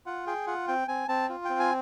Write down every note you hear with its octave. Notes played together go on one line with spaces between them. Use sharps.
F4 F#5
G#4 G5
F4 F#5
C4 G5
C4 G#5
C4 A5
F4
C4 G5
G#5